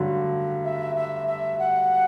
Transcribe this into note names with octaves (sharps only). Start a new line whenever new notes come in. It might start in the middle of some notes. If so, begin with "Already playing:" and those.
Already playing: G2 D3 F#3
E5
E5
E5
F#5